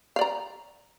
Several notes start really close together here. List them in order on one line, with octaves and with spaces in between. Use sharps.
F5 D5 A#5